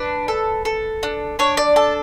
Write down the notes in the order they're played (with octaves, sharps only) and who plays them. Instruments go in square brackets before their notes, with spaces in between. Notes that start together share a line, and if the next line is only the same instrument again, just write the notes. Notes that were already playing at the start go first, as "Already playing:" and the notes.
Already playing: [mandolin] D4 B4
A4
A4
D4
D4 C#5
D5
A4 A5